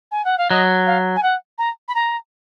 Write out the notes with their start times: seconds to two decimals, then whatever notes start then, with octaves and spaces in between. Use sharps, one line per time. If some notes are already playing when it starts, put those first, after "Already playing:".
0.11 G#5
0.24 F#5
0.37 F5
0.50 F#3 D#5
0.86 F5
1.15 G#5
1.22 F#5
1.58 A#5
1.88 B5
1.94 A#5